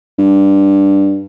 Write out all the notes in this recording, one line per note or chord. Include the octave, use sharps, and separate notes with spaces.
G2